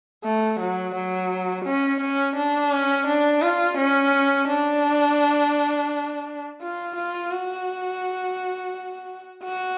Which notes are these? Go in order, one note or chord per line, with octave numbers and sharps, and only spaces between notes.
A3
F#3
F#3
C#4
C#4
D4
C#4
D4
F4
C#4
D4
F4
F4
F#4
F#4